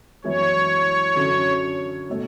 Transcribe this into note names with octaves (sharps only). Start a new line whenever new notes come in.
F#2 E3 G#3 B3 E4 C#5
F#2 D3 F#3 C#4
B2 A3